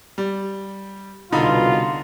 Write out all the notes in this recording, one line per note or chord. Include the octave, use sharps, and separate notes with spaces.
G3
C2 B2 D3 D#4 F4 B5